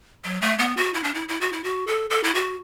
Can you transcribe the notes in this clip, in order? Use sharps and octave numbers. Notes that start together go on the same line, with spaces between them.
F#3
A3
B3
F#4
E4
D4
E4
E4
F#4
E4
F#4
A4
A4
E4
F#4